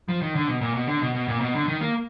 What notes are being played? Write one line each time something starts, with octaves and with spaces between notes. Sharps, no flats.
F3
D#3
D3
B2
A#2
B2
D3
B2
B2
A#2
B2
D3
D#3
A#3